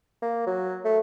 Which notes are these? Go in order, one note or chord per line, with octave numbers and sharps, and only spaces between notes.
A#3
F#3
A3